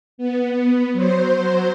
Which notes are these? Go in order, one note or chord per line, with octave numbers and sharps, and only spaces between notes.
B3
F#3 C5